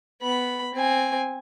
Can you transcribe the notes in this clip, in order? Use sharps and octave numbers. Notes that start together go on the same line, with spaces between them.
B3 B5
C4 G#5